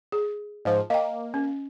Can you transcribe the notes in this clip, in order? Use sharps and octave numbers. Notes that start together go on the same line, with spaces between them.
G#4
G#2 F3
A#3 D#5 G5
C#4